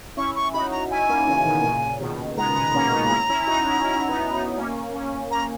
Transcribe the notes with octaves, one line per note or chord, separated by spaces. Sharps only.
C#4 E4 C#6
C#6
D#4 F#4 B5
A#5
C#4 E4 G#5
A#3 C#4
C#3 E3
B2 D#3
A#2 C#3
B2 D#3
G#3 B3 A#5
G#3 B3
A#3 C#4
B3 D#4
C#4 E4
C#4 E4
D#4 F#4
C#4 E4
C#4 E4
B3 D#4
B3 D#4
A#3 C#4
A#3 C#4
A#3 C#4 A#5